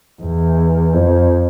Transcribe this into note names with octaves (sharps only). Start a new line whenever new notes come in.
E2
F2